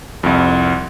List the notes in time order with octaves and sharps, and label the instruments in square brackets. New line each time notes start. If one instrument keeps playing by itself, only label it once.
[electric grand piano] C2 F2